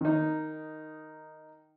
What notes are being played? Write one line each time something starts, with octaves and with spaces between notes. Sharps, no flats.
D#3 D#4